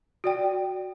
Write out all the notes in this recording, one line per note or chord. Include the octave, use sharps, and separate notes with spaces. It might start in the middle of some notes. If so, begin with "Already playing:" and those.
F#4 D5 G5